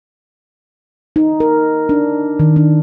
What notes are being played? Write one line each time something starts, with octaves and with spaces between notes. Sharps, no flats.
D#4
A#4
D4
D#3
D4